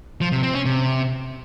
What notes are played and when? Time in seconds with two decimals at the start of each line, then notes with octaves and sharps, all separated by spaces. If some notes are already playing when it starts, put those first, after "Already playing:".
0.21 F3
0.32 C3
0.43 C4
0.54 C#4
0.65 C3